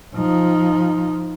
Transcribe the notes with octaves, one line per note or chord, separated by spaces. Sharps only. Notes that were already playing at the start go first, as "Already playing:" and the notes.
F3 D#4